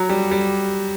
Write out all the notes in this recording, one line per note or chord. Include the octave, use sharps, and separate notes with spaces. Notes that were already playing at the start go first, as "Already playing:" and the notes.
Already playing: F#3
G3
G3